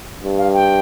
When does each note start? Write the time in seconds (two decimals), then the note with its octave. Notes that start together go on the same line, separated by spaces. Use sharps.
0.23 G2
0.38 F5
0.54 G5